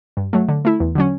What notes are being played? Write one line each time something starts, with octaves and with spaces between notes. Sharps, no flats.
G2
F#3 A3
D3
A3 E4
E2
D3 F#3 C#4